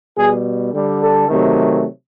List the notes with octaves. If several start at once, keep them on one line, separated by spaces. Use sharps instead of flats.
B2 G3 G#4
D3 G3
A4
C3 D#3 F#3 A3